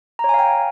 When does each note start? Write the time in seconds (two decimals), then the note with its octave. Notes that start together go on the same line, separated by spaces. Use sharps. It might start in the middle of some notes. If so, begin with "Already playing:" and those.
0.19 A#5
0.24 C#5
0.29 G#5
0.34 F5
0.39 G5